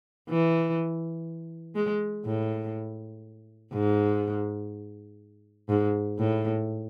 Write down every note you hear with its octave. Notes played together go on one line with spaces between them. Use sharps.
E3
G#3
A2
G#2
G#2
A2